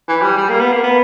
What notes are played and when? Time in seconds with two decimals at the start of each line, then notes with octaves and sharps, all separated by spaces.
0.08 E3
0.23 G3
0.38 G3
0.49 A#3
0.60 B3
0.72 A#3
0.83 B3